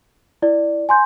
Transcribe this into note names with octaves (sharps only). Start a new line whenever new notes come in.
E4 D5
G#5 C6 G6